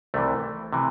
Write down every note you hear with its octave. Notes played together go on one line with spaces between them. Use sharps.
C2 C3 E3 A3
C3 E3